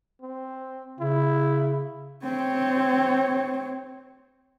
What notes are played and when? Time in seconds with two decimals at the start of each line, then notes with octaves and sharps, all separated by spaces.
0.21 C4
1.00 C#3 E4
2.24 C4 C#5